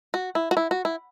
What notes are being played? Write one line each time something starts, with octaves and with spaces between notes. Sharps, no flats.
F#4
E4
F#4
E4
F#4
E4